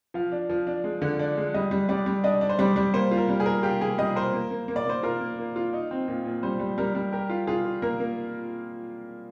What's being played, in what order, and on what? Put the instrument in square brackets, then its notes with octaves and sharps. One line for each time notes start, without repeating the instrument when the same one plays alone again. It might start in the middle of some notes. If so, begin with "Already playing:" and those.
[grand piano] F3 [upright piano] F5
[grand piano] D4
F3
D4
G#3
D3
D4
G#3
[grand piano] G3 [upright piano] D#5
[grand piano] G3
[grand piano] G3 [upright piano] D5
[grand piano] G3
[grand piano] D4 [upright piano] D#5
[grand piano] D4
[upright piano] C5
[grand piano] G3 [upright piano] D5
[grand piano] G3
[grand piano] A#3 [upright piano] C5
[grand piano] F4
[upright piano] A#4
[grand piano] G3
[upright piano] G#4
[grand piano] A#4
[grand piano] F4 [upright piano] G4
[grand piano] A#3 [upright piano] G#4
[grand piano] G3 [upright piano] D#5
[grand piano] A#4 [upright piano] C5
[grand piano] A#3
A#3
A#3
[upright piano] D5
[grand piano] A#3 [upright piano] C5
[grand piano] F4 [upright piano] A#4
[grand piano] A#3
A#3
F4
D#4
C4
A#2
A#2
[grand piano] G3 [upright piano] C5
[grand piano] G3
[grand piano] G3 [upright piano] A#4
[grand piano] G3
[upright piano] G4 [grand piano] A#4
[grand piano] F4
[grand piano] F4 [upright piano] G#4
[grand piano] F4
[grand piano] A#3 [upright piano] A#4
[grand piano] A#3